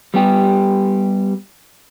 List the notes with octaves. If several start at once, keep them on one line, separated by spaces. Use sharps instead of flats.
G3 B3 G4